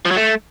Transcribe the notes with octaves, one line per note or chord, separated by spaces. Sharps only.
F3
F#3
A3